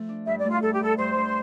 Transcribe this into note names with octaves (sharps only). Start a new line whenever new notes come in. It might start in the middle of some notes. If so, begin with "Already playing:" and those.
Already playing: F3 A3
D4
G2 E5
D5
A3
F4
G2 A4
G4
G2 A4
G2 C5
G2